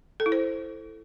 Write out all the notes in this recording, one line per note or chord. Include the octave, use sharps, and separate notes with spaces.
A4
E4
C5